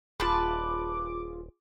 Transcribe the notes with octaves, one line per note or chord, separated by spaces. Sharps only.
D#1 F4 G#4 B4 A5 D6